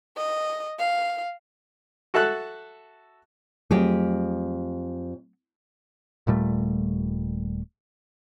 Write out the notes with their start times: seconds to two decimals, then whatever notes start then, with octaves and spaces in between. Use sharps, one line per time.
0.17 D#5
0.79 F5
2.14 F#4 A4 E5 A5 F#6
3.71 F2 F#3 A3 G4 G#4
6.27 D#1 A#2 G3 A3